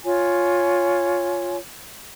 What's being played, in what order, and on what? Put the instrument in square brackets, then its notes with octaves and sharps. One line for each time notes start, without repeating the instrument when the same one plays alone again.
[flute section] F4 C#5 G#5